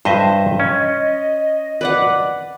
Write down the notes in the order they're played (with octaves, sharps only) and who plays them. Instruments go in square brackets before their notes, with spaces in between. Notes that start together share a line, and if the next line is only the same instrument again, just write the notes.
[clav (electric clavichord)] G2 D#5 E5 [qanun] C5
[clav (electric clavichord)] C#4 [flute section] D#5
[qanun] B4 D5 F#5